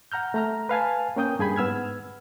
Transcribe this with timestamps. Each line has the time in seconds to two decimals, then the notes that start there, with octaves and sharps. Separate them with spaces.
0.12 F#5 A#5 F6 G6
0.34 A3 A#5 F6
0.69 B4 F5 G#5 A5
1.16 A#3 C#4 G5 D#6 G6
1.39 G2 G#4 G#5 B5
1.56 G#2 B3 E6 F6 G#6